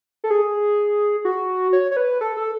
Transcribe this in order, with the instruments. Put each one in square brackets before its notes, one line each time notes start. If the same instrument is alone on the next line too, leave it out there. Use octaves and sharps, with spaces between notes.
[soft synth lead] A4
G#4
F#4
C#5
C#5
B4
A4
A4